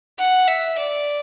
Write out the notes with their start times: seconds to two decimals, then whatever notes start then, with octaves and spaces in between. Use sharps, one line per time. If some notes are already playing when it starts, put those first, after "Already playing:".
0.18 F#5
0.48 E5
0.78 D5